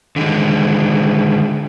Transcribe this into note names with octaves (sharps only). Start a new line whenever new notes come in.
D3 D#3 G#3